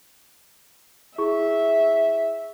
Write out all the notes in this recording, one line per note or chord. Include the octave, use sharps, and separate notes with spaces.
E4 G#4 E5 C#6